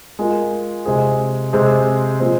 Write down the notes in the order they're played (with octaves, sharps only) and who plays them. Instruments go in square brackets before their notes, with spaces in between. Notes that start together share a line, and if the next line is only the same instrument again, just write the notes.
[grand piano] G#3 F4 A#4
C3 G#3 C4 G#4
C3 G#3 C4 G#4
A#2 F3 G#3 C4